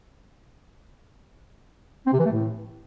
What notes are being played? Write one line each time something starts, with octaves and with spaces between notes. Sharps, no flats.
C4
C3
E3
A3
A2